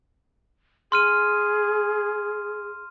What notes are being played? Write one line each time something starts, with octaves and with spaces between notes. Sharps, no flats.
G#4 C6 F6 D#7